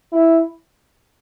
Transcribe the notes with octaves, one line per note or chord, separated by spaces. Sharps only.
E4